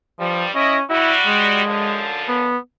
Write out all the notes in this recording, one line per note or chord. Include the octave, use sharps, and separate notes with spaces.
G2 F3 G3
C#4 E4 D#5
G3 E4 F#4
G#3
F#2 D3 F3
B3